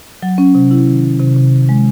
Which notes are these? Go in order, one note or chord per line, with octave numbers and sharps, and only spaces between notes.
F#3
C#4
C3
E4
D#3
F#3
C3
C3
D#3
G#3